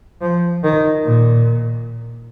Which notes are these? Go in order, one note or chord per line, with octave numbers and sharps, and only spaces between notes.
F3
D#3
A#2